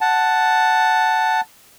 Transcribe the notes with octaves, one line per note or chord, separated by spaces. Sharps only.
F#5 A5